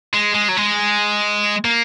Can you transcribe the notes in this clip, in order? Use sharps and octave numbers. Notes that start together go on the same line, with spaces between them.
G#3
G#3
F#3
G#3
A#3